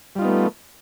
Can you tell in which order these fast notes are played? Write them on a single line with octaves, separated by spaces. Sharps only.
G3 F4 D#4 B3 A3